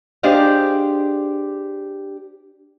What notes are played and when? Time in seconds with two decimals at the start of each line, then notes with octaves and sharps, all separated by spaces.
0.23 D4 G4 G#4 C5 D#5 F5